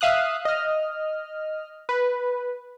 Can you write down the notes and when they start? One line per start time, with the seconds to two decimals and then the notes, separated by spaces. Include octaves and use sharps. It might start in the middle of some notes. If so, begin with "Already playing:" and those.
0.01 E5 F5 D#6 F#6
0.45 D#5 F6
1.89 B4